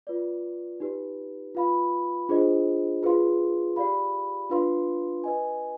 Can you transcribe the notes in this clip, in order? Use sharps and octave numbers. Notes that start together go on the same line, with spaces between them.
F4 B4 D5
D#4 G4 B4
F4 B4 F5 B5
D4 F4 G#4 C5 D#5
F4 G#4 B4 F5 C6
G4 D5 F5 B5
D4 F4 B4 F5 C6
B4 D#5 G#5